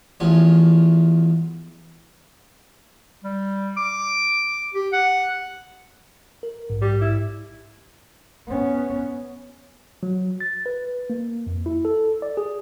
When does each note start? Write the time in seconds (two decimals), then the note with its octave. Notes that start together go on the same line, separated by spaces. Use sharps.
0.20 A1 E2 F3 C#5
3.24 G3
3.77 D6
4.74 G4
4.93 F#5
6.43 A#4
6.70 A#1 G#2
6.82 G3
7.01 E4
8.48 B3 C#4
10.03 F#3
10.40 A6
10.66 B4
11.10 A#3
11.47 F2
11.66 E4
11.85 A4
12.22 D5
12.37 G#4